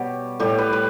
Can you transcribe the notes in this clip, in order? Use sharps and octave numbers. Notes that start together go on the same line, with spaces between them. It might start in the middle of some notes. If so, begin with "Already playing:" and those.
Already playing: B2 G3 G4 C#5
A2 G3 G4
B4
B4